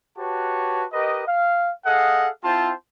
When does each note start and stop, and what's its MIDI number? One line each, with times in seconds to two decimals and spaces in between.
0.18 0.84 66
0.18 0.84 67
0.18 0.84 71
0.18 0.84 73
0.18 0.84 81
0.93 1.22 67
0.93 1.22 70
0.93 1.22 71
0.93 1.22 75
1.27 1.71 77
1.86 2.29 68
1.86 2.29 69
1.86 2.29 75
1.86 2.29 77
1.86 2.29 78
2.44 2.72 60
2.44 2.72 64
2.44 2.72 65
2.44 2.72 72
2.44 2.72 79
2.44 2.72 81